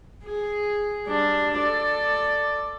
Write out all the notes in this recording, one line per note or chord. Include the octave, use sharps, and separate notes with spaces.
G#4
G3 D4
A4 D5